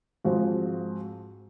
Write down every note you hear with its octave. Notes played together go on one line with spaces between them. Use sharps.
G#2 F3 G#3 C4 F#4